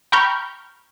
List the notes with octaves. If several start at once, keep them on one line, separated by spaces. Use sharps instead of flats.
G5 A#5 B5 C#6 F6 G6